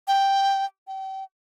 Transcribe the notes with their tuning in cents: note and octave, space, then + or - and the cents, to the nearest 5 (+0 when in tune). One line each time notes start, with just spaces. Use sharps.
G5 +5
G5 -30